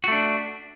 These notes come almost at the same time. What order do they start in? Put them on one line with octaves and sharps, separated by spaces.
F#4 A3 D4